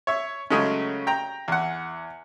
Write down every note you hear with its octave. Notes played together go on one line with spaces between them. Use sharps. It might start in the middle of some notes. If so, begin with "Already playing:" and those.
C#5 E5
C#3 F#3 G#3 A3 C#4
G5 A#5
E2 F#5